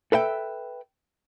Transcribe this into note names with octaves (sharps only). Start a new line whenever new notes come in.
A4 B4 E5 G5